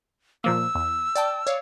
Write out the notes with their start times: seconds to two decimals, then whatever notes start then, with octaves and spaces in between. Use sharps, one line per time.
0.44 A#2 F3 A#3 E6
0.75 E2
1.16 D5 G5 A5
1.47 C#5 D5 F5